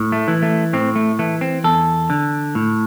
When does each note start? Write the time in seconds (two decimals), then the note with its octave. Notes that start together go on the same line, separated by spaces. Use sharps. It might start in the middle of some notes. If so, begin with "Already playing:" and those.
Already playing: A2
0.12 A3
0.28 E3
0.42 A3
0.73 A2 C4
0.96 A3
1.19 E3 A3
1.41 C4
1.64 E2 A4
2.10 D3
2.55 A2